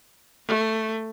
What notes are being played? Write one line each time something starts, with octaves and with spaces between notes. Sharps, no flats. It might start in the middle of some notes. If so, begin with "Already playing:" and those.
A3